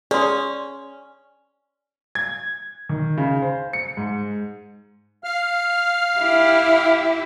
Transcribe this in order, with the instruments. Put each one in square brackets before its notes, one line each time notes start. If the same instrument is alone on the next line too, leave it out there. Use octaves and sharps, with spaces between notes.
[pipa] C#4 [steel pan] G#4 [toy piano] D5 C6
[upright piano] G#6
D#3
C#3
C5
C#7
G#2
[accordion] F5 F6
[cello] E4 G4